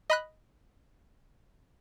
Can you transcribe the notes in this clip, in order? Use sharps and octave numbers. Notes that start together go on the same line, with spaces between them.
D#5 B5 F#6